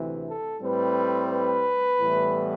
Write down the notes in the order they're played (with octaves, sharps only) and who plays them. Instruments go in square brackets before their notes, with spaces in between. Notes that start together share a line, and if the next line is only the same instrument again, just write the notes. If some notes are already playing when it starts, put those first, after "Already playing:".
Already playing: [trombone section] D2 C3 E3
A4
A2 G3 C4 B4
B4
A2 E3 G3 B3